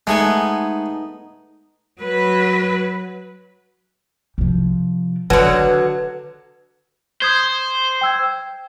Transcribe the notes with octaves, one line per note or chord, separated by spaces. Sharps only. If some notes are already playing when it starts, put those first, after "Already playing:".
G#3 A3 B3 D#4 G#5
F#3 B4
C3 F3
D3 D#3 F#3 D4 B4
C5 D#6 G6 G#6
G5 E6 G#6